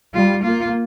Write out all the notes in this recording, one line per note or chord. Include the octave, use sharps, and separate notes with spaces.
G3 F4
A#3 F4